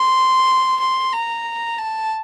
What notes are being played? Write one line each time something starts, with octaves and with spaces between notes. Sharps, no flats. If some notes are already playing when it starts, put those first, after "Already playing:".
Already playing: C6
C6
A#5
A5